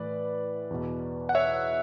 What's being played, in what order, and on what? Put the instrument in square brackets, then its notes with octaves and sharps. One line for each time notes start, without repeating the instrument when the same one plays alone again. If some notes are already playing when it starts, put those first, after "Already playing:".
Already playing: [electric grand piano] A2 E3 B4 D5
E2 B2
F#5
C#5 E5